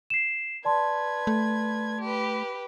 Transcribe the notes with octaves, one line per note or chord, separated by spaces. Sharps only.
C7 E7
B4 D5 A5 C6 G#6
A3
G4 B4